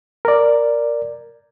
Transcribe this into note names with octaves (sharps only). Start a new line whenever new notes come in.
A#4 D5